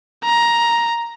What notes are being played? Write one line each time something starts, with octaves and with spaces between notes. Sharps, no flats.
A#5